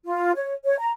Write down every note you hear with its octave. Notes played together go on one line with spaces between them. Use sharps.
F4
C#5
C#5
A#5